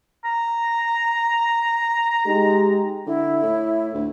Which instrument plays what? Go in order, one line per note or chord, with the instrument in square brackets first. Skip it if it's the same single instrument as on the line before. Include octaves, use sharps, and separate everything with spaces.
[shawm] A#5
[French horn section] G#3 D#4 G4
[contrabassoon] D3 [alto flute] E4
[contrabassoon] A2
D2